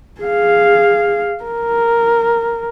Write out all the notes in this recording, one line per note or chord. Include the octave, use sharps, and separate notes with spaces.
G#4 F5
A#4